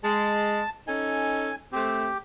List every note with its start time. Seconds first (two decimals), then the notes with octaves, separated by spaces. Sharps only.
0.04 G#3 A5
0.88 C#4 D#4 A4 G#5
1.73 A3 C4 G4